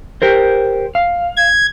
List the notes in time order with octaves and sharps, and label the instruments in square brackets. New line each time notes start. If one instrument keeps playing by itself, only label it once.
[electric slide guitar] G4 A#4 C5
F5
[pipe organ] G#6